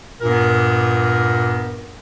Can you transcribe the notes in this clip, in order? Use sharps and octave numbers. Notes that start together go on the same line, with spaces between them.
G2 A#2 B3 A#4